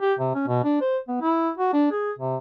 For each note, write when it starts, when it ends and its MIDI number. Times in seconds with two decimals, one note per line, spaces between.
0.01 0.13 67
0.19 0.32 48
0.34 0.45 61
0.47 0.60 47
0.64 0.78 62
0.81 0.97 72
1.08 1.16 59
1.21 1.50 64
1.57 1.71 66
1.73 1.87 62
1.91 2.12 68
2.18 2.36 48